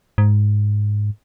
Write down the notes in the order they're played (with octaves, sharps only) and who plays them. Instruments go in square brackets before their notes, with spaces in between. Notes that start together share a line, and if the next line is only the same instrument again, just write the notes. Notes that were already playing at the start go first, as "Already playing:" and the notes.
[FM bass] G#2